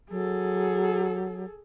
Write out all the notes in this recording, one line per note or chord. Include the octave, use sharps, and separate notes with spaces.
F#3 G#4 A4